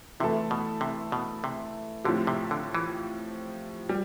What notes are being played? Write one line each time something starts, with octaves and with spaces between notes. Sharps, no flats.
C3 E3 A3 E4 A4
B2
C3
B2
C3
A2 D3 F3 C4 G4
C3
D3
E3
G3